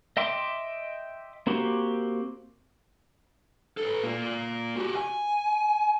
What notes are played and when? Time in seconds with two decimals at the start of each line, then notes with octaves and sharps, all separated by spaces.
0.17 D#5 E5 G5 C6 D6
1.47 A#3 C4 F#4 G4
3.77 A4 B4
4.03 A#3 F4
4.76 F#4 G4
4.96 G#5